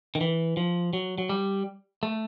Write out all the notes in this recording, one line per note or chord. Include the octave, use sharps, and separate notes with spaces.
D#3
E3
F3
F#3
F#3
G3
A3